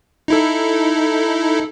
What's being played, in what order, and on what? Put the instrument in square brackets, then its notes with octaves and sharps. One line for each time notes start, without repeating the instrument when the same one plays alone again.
[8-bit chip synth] D#4 E4 A4